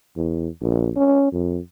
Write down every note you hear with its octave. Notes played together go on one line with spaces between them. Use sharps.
E2
A#1
C#4
F2